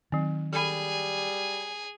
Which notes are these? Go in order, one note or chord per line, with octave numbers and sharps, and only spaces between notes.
D#3 F#3 C4
G3 G#4 A4 G#5 B5